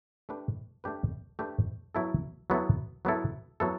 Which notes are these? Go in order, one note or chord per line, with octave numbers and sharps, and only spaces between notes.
A3 D4 G4 B4
A3 D4 G4 B4
A3 D4 G4 B4
F#3 B3 E4 A4
F#3 B3 E4 A4
F#3 B3 E4 A4
F#3 B3 E4 A4